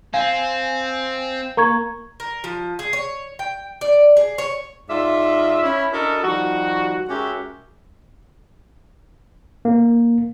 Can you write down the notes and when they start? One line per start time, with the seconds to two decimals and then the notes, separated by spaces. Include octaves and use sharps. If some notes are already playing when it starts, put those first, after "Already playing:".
0.14 C4 F5 G#5
1.57 A#3 A#5 C#6 G#6
2.20 A#4
2.44 F3
2.79 G#4
2.93 C#5
3.39 G5
3.81 D5
4.17 G#4
4.38 C#5
4.89 G#2 F4 D5 E5
5.63 C#4 E4
5.92 D4 E4 F#4 A4 A#4 D#5
6.23 D#3 F3 G3 F#4
7.08 G#3 C#4 F#4 G4 A#4 E5
9.65 A#3